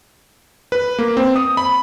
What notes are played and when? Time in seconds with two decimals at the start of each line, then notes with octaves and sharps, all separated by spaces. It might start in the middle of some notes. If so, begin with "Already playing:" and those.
0.72 B4
0.99 A#3
1.17 C4
1.36 D#6
1.57 B5